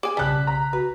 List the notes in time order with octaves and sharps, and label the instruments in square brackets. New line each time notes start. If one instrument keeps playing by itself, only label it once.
[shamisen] G#4 G#5 [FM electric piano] D6
[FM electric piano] B1 C#3 B6 [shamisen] G3 G4 [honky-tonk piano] A5 F#6
[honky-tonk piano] A#5
[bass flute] F#4 [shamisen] B4